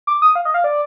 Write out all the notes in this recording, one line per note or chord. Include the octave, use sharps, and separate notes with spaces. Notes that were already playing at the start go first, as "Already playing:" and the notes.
D6
D#6
F5
D#5
F5
D5